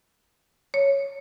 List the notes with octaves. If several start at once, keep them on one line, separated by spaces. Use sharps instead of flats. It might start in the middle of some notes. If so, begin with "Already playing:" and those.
C#5